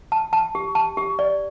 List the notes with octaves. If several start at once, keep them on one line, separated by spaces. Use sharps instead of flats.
A5
A5
G4
A5
G4
D5